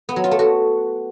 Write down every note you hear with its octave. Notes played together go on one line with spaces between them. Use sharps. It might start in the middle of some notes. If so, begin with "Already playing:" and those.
B3
F#3
F4
A3
F#4